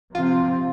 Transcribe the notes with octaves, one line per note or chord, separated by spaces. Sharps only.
C3 F3 C4 F4